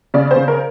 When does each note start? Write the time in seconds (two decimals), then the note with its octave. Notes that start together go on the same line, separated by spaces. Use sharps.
0.14 C#3 D5
0.31 C5
0.36 C#3
0.48 A#4